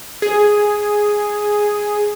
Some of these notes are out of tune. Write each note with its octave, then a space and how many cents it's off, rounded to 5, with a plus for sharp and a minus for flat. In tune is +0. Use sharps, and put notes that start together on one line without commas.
G#4 +0